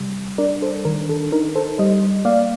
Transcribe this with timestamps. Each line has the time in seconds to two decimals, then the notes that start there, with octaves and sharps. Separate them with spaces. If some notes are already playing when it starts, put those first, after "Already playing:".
Already playing: C3 G3
0.38 D4 A#4 D5
0.62 A4 C5
0.85 D#3 A#4
1.09 A4
1.32 D#4 A#4
1.55 A4 C5
1.78 G3 C5 D#5
2.25 A#3 D5 F5